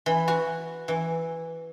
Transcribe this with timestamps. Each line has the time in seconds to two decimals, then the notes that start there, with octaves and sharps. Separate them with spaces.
0.06 E3
0.28 F#4
0.88 E3